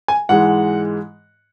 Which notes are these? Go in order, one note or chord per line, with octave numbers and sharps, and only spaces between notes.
G#5
G#2 E3 G#3 F#5